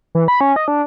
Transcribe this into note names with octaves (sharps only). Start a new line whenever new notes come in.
E3
B5
C#4
D#5
D4